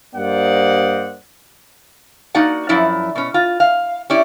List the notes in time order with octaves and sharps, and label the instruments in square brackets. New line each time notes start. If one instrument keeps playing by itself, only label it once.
[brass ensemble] G2 A#3 C5 D5 D#5 F#5
[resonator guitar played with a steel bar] A#3 D#4 F#4 D5 F#5
F#2 F3 E4 D5
B2 C#4
F4
F5
C#4 E4 G4 D5